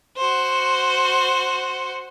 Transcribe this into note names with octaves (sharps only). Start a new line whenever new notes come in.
F#4 C5